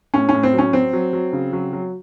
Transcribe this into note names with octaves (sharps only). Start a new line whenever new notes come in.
A2 C#4
A2 C#4
C4
F#3 C#4
F#3 C4
F#3
F#3
C#3
F#3
F#3